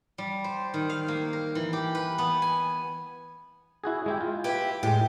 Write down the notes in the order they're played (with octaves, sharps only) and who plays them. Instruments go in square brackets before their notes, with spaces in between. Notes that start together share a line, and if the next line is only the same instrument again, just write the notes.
[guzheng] G3
C5
D#3
F5
A#3
A#4
E3
G4
B4
B3
G#5
[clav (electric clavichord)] E4 F#4 G#4
G#3 E4 G4
F4
[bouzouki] E4 G4 B4
[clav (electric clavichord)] A2 G#3 [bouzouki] G4